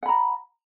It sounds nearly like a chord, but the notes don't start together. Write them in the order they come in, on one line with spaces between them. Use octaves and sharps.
F#5 B5 A#5